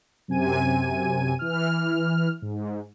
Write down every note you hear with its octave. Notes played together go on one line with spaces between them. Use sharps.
F#2 C3 G#5 D#7
E3 F6
G#2